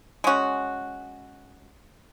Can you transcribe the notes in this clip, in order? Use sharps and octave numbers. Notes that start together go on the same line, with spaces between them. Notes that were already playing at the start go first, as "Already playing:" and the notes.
G#3 C#4 F#4